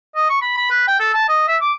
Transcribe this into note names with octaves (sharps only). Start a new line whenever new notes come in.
D#5
C#6
B5
B5
B4
G5
A4
A5
D#5
E5
D6